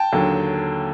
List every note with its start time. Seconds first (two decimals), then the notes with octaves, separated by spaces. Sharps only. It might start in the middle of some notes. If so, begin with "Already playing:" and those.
Already playing: G5 A5
0.12 D#2 D3 F#3